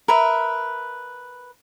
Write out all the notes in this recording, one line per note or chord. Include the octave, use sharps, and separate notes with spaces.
A#4 B4 E5